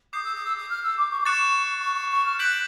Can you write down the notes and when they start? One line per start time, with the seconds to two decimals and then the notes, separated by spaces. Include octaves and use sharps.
0.13 D6 D#6 G6 C7
0.24 E6
0.34 D#6
0.46 E6
0.57 D#6
0.70 F6
0.83 E6
0.97 D6
1.11 C#6
1.21 D6
1.25 C#6 F#6 A6 C#7 E7
1.82 C#6
1.96 C#6
2.11 C#6
2.25 F6
2.39 F#6 G6 B6 D7 F#7